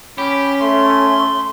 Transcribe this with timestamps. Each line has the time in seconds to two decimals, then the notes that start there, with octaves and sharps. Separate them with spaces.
0.18 C#4 G4 B5
0.61 A3 C6